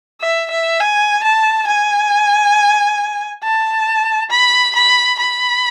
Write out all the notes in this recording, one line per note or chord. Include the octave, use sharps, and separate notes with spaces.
E5
E5
G#5
A5
G#5
A5
B5
B5
B5